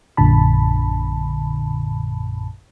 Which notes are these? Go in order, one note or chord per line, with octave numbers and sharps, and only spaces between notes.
A#1 F#2 A#2 D3 A5 B5